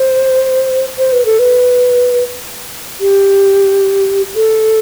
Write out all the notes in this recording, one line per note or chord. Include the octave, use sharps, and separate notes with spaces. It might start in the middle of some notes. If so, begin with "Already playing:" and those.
Already playing: C5
C5
B4
A4
B4
G4
A4